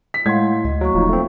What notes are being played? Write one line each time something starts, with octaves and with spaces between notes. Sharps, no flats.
B6
A2 G#3 F5 F#5 C6 G#6
D2 D#5
F#3 A#3 C#6
E1 F3 D#4
A3 C4